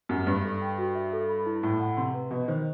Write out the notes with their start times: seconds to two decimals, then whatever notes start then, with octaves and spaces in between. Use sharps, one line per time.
0.09 F#2 G4
0.27 G2 E5
0.44 A4
0.61 G5
0.78 F#4
0.95 E5
1.13 A4
1.29 B5
1.46 E4
1.63 A2 A5
1.80 F#5
1.97 C3 C6
2.14 B4
2.31 B2 D#5
2.48 D#3 C5